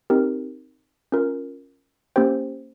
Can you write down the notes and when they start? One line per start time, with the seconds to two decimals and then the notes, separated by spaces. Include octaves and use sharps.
0.10 C4 D#4 G4 A#4
1.12 C#4 F4 A#4
2.16 A#3 C#4 G4 C5 G5